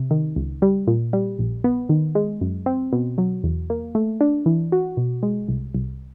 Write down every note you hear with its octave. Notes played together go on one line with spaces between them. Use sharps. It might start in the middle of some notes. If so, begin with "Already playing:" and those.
Already playing: C3
D#3
C#2
G3
A#2
G3
A#1
B3
D#3
G#3
F#2
C4
B2
F#3
E2
A#3
A3
D4
E3
F#4
B2
G#3
C2
C2